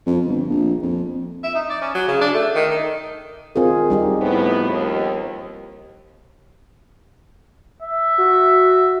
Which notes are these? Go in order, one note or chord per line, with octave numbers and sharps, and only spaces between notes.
F2
G1
A#1
F2
E5
D#4
D5
C#4
F#3
C#3
D4
A3
D#3
D#4
D#3 C4 F4 G#4
G3 D#4 G4
A2 F3 B3
D#2
E5
F#4